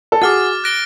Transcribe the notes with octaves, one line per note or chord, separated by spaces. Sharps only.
A4
F#4 G#4 D6 F6 A6
F#6 A#6 D7 G7